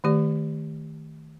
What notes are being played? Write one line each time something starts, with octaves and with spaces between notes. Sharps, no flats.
D#3 A3 G4 D5